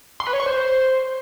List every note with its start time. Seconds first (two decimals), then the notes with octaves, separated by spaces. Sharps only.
0.20 C6
0.27 B4
0.33 C#5
0.40 C#6
0.46 C5